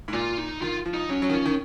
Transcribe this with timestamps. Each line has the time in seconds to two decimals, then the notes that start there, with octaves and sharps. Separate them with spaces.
0.08 G#2
0.13 A#2 F4
0.37 D#4
0.62 D#3 F4
0.86 F3
0.94 D#4
1.09 F#3 C#4
1.22 F#3
1.30 D#3
1.33 F3
1.46 D#3